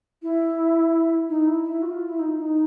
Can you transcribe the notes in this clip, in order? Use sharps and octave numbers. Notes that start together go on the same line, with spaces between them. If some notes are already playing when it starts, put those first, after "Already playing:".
E4
D#4
E4
E4
F#4
F4
E4
D#4
D#4